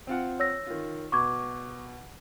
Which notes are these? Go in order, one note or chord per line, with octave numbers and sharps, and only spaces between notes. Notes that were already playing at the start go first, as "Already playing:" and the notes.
C4 F4 F#5
C#5 E6 A#6
D#3 F4
B2 C#6 D6 G#6